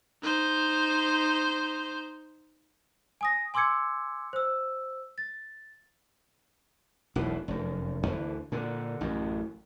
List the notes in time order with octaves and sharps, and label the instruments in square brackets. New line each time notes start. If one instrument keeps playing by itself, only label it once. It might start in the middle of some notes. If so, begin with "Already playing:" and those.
[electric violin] D#4 C5
[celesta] G#5 D#6 A#6
G#5 C6 D6 E6 G#6 C#7
C5 E6
A6
[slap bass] E1 B1 A#2 E3
F1 F#2
D2 D3 E3
A#2 D3
A1 F#2